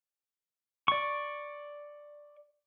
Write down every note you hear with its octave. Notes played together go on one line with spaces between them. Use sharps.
D5 C#6